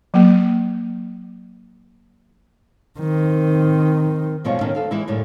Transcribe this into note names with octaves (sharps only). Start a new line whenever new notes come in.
F#3 A#3
D#3 C4
G2 B2 F3 G#3 F4 C#5
D#2 B2 D3 D#3 C#4 D4
D2 A4 F5
E3 G3 G#3 E4
F#2 A2 D3 G3